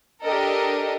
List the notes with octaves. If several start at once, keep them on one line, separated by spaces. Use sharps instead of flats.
D4 G4 A4 A#4 D#5